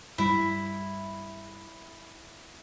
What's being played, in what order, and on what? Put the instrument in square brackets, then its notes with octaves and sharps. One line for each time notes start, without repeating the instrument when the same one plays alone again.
[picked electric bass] G2 G3 [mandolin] E4